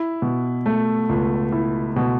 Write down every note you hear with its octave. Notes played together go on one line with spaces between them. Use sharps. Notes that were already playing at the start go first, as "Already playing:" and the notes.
Already playing: E4
B2
A3
C#2
E4
B2